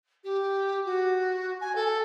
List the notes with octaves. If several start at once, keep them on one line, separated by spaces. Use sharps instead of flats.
G4
F#4
G#5
A4